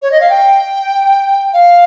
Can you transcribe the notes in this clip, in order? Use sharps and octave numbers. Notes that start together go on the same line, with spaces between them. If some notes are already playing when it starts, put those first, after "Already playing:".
C#5
D#5
F5
G5
F5